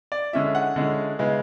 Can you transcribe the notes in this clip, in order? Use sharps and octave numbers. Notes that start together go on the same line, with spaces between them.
D5
D3 G#3 C#4 E4 E5
F#5
D3 G#3 C#4 E4
C#3 G#3 B3 E4